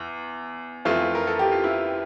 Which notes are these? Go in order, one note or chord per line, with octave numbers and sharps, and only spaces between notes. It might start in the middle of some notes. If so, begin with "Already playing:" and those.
Already playing: E2
F2 E3 A3 F4
A#4
A4
G4
F4
E4